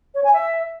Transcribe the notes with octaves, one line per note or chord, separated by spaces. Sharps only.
C#5
G#5
E5